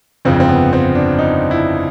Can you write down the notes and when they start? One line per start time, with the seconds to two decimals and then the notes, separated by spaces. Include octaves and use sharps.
0.25 G1 F2 C#3 F3 C4
0.40 C4
0.49 B3
0.73 C4
0.95 D4
1.19 D#4
1.51 E4